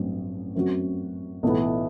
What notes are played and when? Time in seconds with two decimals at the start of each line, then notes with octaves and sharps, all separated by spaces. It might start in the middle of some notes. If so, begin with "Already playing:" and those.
Already playing: A1 G2 F#3 C4
0.55 F#2 F#3 C4 F#4
1.43 B1 A2 E3 B3